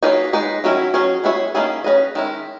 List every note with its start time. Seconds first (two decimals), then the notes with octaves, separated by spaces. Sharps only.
0.03 F#3 A#3 D#4 G#4 B4
0.33 G#3 D#4 G#4 B4
0.64 D#3 F#3 C#4 E4
0.94 F#3 C#4 G#4 C#5
1.24 G#3 B3 E4 G#4 C#5
1.55 D#3 A#3 C#4 E4 G#4
1.84 C#4 G#4 B4 D#5
2.15 D#3 G#3 C#4 E4